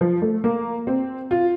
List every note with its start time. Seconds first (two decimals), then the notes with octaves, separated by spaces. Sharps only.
0.01 F3
0.22 A3
0.44 A#3
0.87 C4
1.31 F4